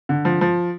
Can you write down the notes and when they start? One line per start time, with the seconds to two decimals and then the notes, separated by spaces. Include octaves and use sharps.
0.09 D3
0.25 F3
0.41 F3